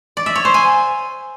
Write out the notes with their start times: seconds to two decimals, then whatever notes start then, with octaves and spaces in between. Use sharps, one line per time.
0.17 D5
0.26 E5
0.36 C#5
0.45 C5
0.54 G#5